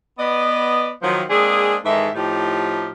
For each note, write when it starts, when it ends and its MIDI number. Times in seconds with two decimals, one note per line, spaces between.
0.18 0.88 59
0.18 0.88 74
0.18 0.88 75
1.02 1.24 51
1.02 1.24 53
1.02 1.24 54
1.30 1.76 56
1.30 1.76 58
1.30 1.76 60
1.30 1.76 62
1.30 1.76 68
1.85 2.10 44
1.85 2.10 51
1.85 2.10 52
1.85 2.10 56
1.85 2.10 69
1.85 2.10 76
2.15 2.89 45
2.15 2.89 53
2.15 2.89 63
2.15 2.89 67